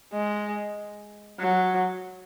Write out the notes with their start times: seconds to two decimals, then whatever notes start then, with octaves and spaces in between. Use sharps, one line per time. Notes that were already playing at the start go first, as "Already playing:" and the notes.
0.13 G#3
1.39 F#3